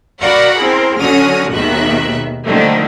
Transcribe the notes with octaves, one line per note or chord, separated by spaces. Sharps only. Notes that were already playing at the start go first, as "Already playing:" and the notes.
F#4 A#4 D5 F5 F#5 B5
C4 E4 G#4 A#4
D3 F#3 C#4 F#4 D#6 F6
G#1 D#2 B2 D#3 E5 F#6
D3 D#3 F3 G3 A3 A#3